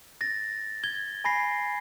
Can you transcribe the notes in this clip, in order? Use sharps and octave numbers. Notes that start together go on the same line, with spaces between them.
A6 A#6
G#6 G7
G#5 B5 A#6 C7